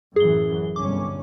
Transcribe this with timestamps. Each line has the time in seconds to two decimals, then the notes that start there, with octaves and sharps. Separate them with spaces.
0.16 A1 F#2 E3 G#4 G7
0.76 G1 C2 C#4 D6